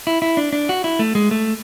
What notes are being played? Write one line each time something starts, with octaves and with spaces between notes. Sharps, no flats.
E4
E4
D4
D4
F#4
E4
A3
G#3
A3